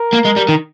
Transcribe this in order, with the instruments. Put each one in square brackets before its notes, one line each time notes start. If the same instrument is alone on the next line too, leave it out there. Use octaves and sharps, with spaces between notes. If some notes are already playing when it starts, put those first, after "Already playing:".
Already playing: [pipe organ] A#4
[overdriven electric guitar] A#3
G#3
G3
D#3